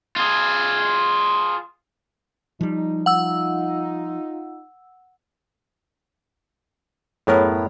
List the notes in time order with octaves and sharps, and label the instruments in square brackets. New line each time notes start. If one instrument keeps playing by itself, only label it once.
[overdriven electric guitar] F4 G#4
[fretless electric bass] F3 G3 [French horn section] D#4
[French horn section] D#4 F4 [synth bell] F#5 E6
[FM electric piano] F#2 G#4 C#5 [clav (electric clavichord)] A2 B3 A#4